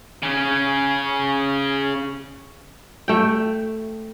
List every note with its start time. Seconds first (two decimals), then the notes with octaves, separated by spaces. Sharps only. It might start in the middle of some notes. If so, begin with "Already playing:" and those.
0.23 C#3 C#4
3.08 A3 G5